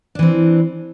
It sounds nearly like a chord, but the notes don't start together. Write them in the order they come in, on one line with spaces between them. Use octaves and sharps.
D4 E3 C4